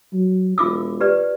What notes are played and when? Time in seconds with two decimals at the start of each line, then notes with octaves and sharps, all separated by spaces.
0.13 F#3
0.58 E1 F4 D6 E6
1.01 G4 B4 D5